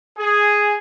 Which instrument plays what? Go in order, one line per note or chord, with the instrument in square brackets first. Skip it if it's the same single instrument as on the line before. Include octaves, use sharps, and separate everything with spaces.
[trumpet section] G#4